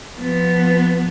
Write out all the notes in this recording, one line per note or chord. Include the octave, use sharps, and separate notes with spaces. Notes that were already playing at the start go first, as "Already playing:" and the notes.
F3 B3